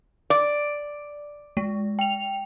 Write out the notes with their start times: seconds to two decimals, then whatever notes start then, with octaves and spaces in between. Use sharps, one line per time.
0.30 D5
1.57 G#3
1.99 G5 F7